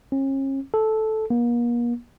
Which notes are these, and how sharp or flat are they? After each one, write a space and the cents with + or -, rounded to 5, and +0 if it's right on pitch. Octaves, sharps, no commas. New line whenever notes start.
C#4 -40
A4 -10
A#3 +40